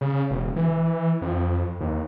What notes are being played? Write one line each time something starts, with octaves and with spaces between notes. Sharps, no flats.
C#3
E1
E3
F2
D#2